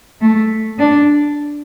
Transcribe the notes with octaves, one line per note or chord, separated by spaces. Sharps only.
A3
D4